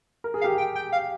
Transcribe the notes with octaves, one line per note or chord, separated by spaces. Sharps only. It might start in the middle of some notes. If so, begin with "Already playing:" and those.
A#4
G#4
F5
G4 A#4
G5
G5
F5